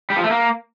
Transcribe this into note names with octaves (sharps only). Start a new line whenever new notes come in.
G3
F3
A3
A#3